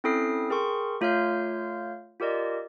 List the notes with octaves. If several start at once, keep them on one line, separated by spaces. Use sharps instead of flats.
C4 C#4 E4 A4 D#6 C7
G#4 A#4 G5 C6 C#6
A3 F4 C#5 F5 F6 G6
F4 G4 A#4 D5 D#5